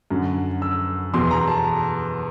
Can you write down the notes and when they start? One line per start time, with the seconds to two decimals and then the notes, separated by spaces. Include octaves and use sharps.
0.11 F#2 D3
0.62 E6
1.14 E2 B2 C6
1.31 A#5
1.48 A5